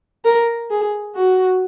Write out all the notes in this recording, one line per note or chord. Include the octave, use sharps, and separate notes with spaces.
A#4
G#4
F#4